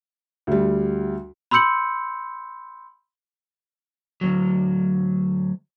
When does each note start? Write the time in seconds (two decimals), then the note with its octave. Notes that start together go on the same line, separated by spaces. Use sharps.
0.47 D2 G3
1.51 B5 C6 E6 G6 C#7 F#7
4.21 D2 G#2 F#3